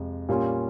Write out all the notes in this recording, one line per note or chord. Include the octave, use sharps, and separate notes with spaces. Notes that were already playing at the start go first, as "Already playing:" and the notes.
Already playing: F2 C3 G#3
A#2 G3 A#3 C#4 F4